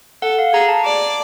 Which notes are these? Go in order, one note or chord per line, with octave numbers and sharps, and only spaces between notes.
A4 F#5
F5
G#4 A#5
A5
D5